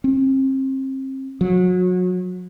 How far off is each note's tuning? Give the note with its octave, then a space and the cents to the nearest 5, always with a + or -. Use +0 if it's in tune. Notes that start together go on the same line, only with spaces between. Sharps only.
C4 +35
F#3 -30